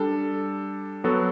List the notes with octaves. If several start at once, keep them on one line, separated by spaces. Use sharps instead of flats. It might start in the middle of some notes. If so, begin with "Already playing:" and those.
Already playing: G3 D4 A4
F#3 B3 F#4 A4